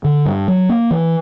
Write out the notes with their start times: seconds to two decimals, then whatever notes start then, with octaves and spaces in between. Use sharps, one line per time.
0.05 D3
0.26 G2
0.48 F#3
0.69 A#3
0.91 E3